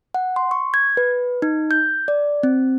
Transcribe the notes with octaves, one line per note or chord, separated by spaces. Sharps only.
F#5
C6
C#6
G#6
B4
D#4
G6
D5
C4